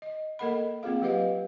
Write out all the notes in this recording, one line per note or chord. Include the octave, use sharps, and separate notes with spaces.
D#5
A#3 A4 A#4 D#5 F#5 B5
A#3 C4 F4 G#4 F5
F#3 G4 B4 D#5 F5 F#5